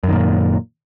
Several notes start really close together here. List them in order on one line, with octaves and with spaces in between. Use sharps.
F#2 D#3 A#2